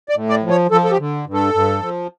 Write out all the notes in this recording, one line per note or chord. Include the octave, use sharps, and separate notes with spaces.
D5
A2
D5
F3
C#5
F3 A4
A4
G4
D3
G2
A4
G2
F3